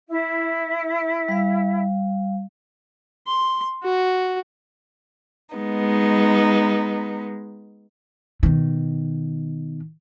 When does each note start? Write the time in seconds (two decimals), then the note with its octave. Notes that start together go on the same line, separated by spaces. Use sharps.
0.08 E4
1.28 G3 F5
3.27 C6
3.83 F#4
5.55 G#3 B3 D#4
8.43 B2 D#3